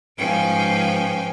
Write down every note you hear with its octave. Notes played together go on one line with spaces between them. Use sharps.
G#2 F3 C#4 B4 G5 G#5